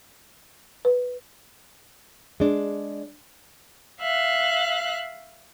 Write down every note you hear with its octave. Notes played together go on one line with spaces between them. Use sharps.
B4
G#3 D4
E5 F5 F#6